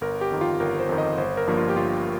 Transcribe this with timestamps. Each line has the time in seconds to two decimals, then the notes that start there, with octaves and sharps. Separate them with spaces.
0.01 G1 A#4
0.21 G4
0.31 F2 D#3
0.41 F4
0.60 G1 A#4
0.79 C5
0.89 F2 D#3
0.98 D#5
1.18 G1 C5
1.37 A#4
1.47 G2 F3 A#3
1.57 F4
1.69 G4
1.76 G1 F4